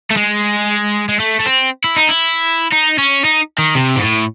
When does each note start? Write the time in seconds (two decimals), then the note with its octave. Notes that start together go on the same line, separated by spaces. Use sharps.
0.11 A3
0.17 G#3
1.09 G#3
1.20 A3
1.40 A3
1.46 C4
1.84 E4
1.96 D#4
2.09 E4
2.73 D#4
2.99 C#4
3.24 D#4
3.58 D#3
3.75 C3
3.96 G#2
4.01 A2